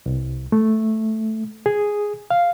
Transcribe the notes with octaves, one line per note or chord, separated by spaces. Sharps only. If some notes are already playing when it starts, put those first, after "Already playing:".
C2
A3
G#4
F5